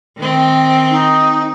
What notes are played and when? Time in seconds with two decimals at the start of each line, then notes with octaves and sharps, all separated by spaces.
0.17 D#3 C4
0.91 D#4